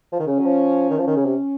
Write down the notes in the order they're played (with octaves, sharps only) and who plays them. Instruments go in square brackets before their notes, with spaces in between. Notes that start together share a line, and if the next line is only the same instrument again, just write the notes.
[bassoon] F3
D#3
[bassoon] C#3 [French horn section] C#4
[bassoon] F#3
F3
D#3
[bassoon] F3 [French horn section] C#4
[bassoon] D#3
C#3
C3